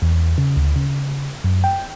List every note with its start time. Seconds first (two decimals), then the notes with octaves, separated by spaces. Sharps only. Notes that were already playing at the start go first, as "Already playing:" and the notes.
0.02 E2
0.38 C#3
0.56 D2
0.76 C#3
1.44 F#2
1.64 G5